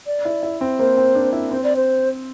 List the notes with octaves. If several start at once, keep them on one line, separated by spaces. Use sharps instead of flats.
D5
E4
E4
C4
A#3 C5
C4
D4
E4
C4 C5
D5
C5